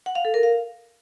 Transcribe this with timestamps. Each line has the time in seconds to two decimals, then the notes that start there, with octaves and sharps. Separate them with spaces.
0.06 F#5
0.15 F5
0.25 A4
0.34 A#4
0.43 F5